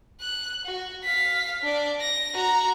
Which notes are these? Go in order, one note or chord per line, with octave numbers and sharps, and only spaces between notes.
F#6
F#4
F5 B6
D4 D5
A#6
F#4 A#5